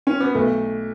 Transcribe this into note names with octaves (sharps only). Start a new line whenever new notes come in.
C#4
B3
B1 A3